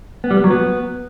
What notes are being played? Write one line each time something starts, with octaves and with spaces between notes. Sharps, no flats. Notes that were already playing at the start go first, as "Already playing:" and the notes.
B3
G3
B3
F#3
B3